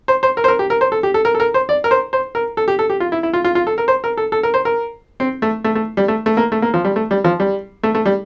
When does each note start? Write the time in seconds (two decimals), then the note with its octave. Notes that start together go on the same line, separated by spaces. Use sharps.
0.08 C5
0.23 C5
0.37 A#4
0.44 C5
0.48 A#4
0.59 G4
0.70 A#4
0.81 C5
0.92 A4
1.03 G4
1.14 A4
1.25 A#4
1.35 A4
1.40 A#4
1.54 C5
1.69 D5
1.84 A#4
1.91 C5
2.13 C5
2.35 A#4
2.57 A4
2.68 G4
2.79 A4
2.90 G4
3.00 F4
3.12 E4
3.23 E4
3.33 F4
3.44 F4
3.55 F4
3.67 A4
3.78 A#4
3.88 C5
4.04 A#4
4.17 A4
4.32 A4
4.43 A#4
4.54 C5
4.65 A#4
5.20 C4
5.42 A3
5.64 A3
5.75 A3
5.97 G3
6.08 A3
6.26 A3
6.37 A#3
6.52 A3
6.62 A#3
6.74 F3
6.85 G3
6.96 A3
7.11 G3
7.24 F3
7.40 G3
7.83 A3
7.95 A3
8.06 G3